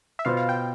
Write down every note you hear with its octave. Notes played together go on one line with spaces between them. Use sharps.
E5
B2 B3 F4 C5 F5
F5
G5